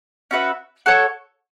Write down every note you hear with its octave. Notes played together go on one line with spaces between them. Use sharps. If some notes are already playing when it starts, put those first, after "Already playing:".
C#4 F#4 B4 E5
F#4 A4 C#5